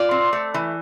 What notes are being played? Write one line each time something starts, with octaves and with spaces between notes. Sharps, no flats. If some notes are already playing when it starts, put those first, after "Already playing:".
Already playing: F4 D5
C4
A3
E3